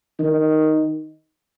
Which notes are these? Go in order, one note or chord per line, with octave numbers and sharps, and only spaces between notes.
D#3